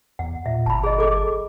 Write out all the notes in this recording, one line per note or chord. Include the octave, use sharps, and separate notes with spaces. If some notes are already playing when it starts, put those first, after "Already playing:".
E2 F#5
A#2 E5
G1 A5 B5
G#4 D#5
G#4 A4 D6